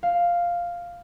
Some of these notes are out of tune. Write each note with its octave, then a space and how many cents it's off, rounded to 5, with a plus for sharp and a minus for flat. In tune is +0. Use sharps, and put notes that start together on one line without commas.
F5 +0